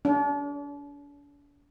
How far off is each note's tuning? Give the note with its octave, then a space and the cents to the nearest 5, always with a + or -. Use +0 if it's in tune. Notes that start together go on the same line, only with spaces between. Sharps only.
D4 -40